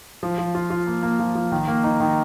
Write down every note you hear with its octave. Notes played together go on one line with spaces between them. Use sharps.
F3
F3
F4
F4
A#3
A#3
F3
F3
D#3
A#3
D#4
D#3